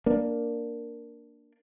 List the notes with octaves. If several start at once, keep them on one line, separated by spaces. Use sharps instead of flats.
A#3 D4